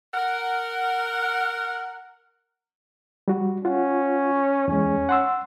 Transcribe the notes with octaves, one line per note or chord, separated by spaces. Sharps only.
A#4 F#5
G3 F#4
C#4 F4 F#5
E2 G#3 C#4
F#5 C6 E6